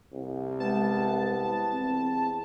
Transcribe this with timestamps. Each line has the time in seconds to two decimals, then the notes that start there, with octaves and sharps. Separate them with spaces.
0.13 C2
0.60 G#3 B3 A5
1.69 E2 C4